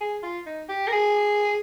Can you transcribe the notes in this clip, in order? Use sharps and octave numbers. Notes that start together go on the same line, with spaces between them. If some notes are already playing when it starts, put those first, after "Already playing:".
G#4
F4
D#4
G4
A#4
G#4